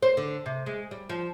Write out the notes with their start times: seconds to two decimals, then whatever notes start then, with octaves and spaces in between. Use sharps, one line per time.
0.02 C5
0.17 D3
0.46 C3
0.66 G#3
0.91 G3
1.10 F3